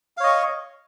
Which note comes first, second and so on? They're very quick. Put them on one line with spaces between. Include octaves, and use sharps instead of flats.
F5 C#5 D#5 C#6